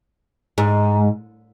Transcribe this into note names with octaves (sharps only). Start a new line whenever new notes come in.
G#2